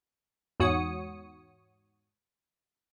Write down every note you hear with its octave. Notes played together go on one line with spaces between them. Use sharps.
E2 G#2 F#4 C#5 D#6 C#7